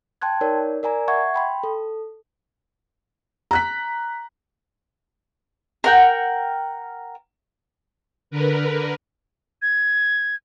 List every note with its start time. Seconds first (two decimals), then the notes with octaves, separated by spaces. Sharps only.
0.22 G5 A5 C6 F#6 G#6
0.41 D#4 A#4 C#5 D5
0.83 A#4 D5 G#5 A#5
1.08 E5 F#5 C#6 G#6
1.34 G5 B5 C6
1.64 A4
3.51 A#5 F#6 B6
5.84 A#4 F#5 G5
8.31 D3 A#4 B4
9.62 G#6